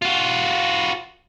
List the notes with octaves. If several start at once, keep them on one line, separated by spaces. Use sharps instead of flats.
F4 F#4